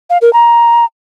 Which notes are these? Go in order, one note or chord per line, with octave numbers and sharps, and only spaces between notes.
F5
A#4
A#5